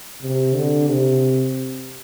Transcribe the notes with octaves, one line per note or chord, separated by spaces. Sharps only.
C3
D3
C3